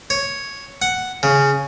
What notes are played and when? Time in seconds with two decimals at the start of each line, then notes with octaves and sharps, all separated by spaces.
0.10 C#5
0.82 F#5
1.23 C#3